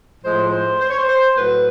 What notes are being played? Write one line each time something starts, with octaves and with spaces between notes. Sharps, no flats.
A2 F3 G#3 C5
C5
C5
C#5
C5
C5
A2 F#3 B4